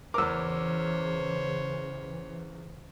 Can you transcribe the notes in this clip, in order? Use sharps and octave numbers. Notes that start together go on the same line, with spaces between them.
E2 C#3 E3 A#4 C5 C#5 D6 E6